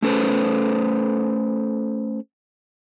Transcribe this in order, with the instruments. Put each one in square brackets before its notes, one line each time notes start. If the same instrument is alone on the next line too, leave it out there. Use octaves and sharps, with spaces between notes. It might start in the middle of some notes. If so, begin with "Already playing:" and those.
[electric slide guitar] A3 C#4 A4 B4 C5